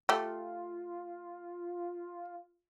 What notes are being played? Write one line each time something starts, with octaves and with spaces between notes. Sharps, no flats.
A3 F4 G4